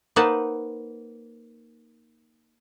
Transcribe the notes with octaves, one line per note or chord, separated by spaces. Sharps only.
A#3 D#4 B4 C5 F#5 A5